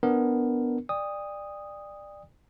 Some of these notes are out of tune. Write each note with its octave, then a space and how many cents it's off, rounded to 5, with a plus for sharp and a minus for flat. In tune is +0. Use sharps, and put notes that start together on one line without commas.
B3 +0 D4 +0 A#4 +0
D5 +20 G5 +40 D#6 +0